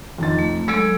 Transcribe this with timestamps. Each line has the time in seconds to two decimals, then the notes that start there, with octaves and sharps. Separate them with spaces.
0.18 F2 D#4 A6
0.39 A3
0.68 F#3 G#3 A4 E6 G#6 D7